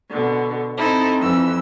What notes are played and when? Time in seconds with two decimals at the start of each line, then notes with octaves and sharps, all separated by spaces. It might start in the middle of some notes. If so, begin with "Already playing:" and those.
0.10 B2 D3
0.76 C4 D#4 E4 A4
1.20 F2 E3 E6